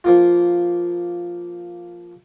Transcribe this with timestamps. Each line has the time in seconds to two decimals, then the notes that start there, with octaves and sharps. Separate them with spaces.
0.04 F3 A#3 F4